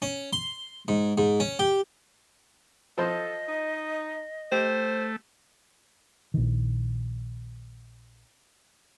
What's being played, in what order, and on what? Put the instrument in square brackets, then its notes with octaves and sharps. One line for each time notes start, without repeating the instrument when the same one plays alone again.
[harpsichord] C#4
C6
G#2
G#2
C#4
G4
[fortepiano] F3 C5 C6 [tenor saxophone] A4 [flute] D#5
[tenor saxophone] D#4
[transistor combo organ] A3 [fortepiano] G4 [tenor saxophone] C5
[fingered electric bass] A#1 D#3